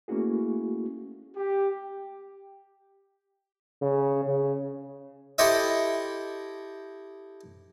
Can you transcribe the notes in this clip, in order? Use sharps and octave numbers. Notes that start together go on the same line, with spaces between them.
A3 A#3 C#4 E4 F#4 G#4
G4
C#3
C#3
E4 G4 A4 C5 D#5 E5